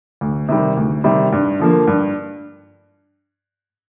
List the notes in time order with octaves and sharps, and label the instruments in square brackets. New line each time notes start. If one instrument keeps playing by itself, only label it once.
[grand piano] D2
C3 D#3 G3
D2
C3 D#3 G3
G2
D3 F3 A#3
G2